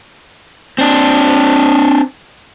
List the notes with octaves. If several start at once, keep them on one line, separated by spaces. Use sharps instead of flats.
C4 D4